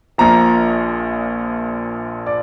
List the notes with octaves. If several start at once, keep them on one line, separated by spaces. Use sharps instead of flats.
A#1 A#2 F3 A#5
D5